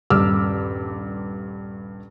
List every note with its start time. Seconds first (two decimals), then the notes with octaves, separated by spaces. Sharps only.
0.10 D#1 G2 D6 E6 F6